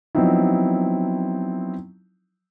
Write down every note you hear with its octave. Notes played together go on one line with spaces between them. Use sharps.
F3 F#3 B3 C4 D#4 E4